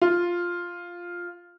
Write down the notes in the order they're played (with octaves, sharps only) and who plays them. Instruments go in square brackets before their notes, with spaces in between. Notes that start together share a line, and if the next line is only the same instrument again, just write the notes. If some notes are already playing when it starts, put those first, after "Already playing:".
[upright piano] F4